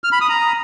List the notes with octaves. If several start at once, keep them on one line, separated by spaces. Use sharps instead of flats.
F6
B5
D#6
A#5